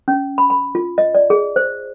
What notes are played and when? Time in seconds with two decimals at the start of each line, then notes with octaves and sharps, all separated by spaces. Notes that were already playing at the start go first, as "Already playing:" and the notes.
0.08 C#4
0.38 B5
0.50 B5
0.75 F4
0.98 D#5
1.15 D5
1.30 G#4
1.56 C5